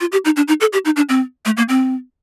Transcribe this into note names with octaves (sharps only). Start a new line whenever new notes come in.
F4
G4
D#4
D4
D#4
A4
G4
D#4
D4
C4
A3
A#3
C4